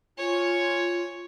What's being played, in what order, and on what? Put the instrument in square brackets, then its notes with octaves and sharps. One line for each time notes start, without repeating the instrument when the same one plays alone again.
[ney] F4 [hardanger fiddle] C#5 G#5